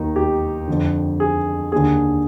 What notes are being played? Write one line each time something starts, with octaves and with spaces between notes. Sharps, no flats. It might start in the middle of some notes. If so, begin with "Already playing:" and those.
Already playing: D#2 D#3 D#4
G4
F2 D3
G#4
D#2 D3 G#4